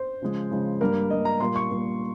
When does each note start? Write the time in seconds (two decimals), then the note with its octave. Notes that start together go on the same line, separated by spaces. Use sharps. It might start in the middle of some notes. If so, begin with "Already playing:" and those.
Already playing: C5
0.22 C#3 F3 G#3
0.51 C#3 F3 G#3
0.81 G2 G3 A#3 A#4
1.10 G2 G3 A#3 D#5
1.25 A#5
1.40 A#2 G3 A#3 C6
1.56 C#6
1.71 A#2 G3 A#3